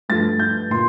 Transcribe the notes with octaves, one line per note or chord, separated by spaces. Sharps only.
G2 F3 A3 A6
G6
A#2 C6